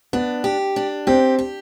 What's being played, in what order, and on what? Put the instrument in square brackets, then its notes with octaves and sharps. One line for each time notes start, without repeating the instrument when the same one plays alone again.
[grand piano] B3 [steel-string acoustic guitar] D4
[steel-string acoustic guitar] G4
D4
[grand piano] C4 [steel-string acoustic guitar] G4
[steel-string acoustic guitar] G4